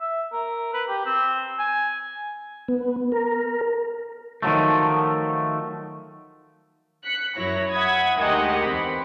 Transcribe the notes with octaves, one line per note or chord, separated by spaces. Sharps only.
E5
A#4
B4
G4
C4
G#5
B3
A#4
D#3 F3 F#3 A3
F#6 B6 C#7
F#2 F#3 E4 C#5 A#6
E5 F#5 B5 D#6 G#6
D2 D#3 G#3 G4 D#5 F#5
E2 C4 B5